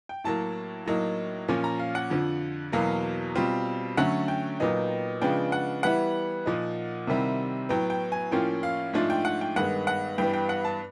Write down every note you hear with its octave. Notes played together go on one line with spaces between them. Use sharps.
G5
A2 F#3 A#3 A5
A2 F#3 A#3 D#4
A#2 F3 A#3 C#4
A#5
F5
F#5
F2 D3 F3
E2 B2 F#3 A#3 F5
B2 G3 C4 F4
D3 F#3 A3 C#4 F#5
G5
A#2 F#3 B3 D#4
C#3 F3 G#3 B3 D4 G5
F#5
E3 G3 B3 E4 F#5
A#2 F3 A#3 D#4
C3 D#3 G3 C4 E4
A2 F#3 B3 G5
G5
G#5
A2 F3 A#3 C#4 F4 G5
F5
G#2 F3 A3 D4 F4
G5
F#5
G5
G2 D#3 G#3 B3 F#5
F#5
G2 E3 G3 B3 G5
G5
F#5
A5